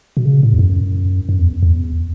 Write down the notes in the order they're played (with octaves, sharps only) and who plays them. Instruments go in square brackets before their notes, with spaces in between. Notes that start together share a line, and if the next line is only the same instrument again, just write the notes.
[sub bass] B2
C#3
A2
E2
F#2
F#2
E2
E2